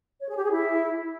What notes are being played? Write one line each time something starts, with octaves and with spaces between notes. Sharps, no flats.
C#5
G#4
G4
G#4
E4